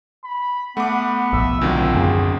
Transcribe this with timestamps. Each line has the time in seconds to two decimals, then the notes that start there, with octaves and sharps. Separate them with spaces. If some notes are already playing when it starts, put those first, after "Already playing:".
0.24 B5
0.77 A3 B3 F#5 D6
1.33 B1 A2 F3 E5
1.61 D2 D#3 F#3 C4 F4
1.95 F#2 A#3 C#4 G#4